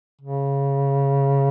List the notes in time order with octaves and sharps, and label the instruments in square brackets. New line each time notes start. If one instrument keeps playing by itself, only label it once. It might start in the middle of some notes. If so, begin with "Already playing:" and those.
[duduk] C#3